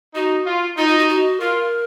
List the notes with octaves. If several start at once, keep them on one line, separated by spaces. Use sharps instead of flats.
D#4 F#4
F4
D#4 F4
F4
F#4
F#4
F4 A#4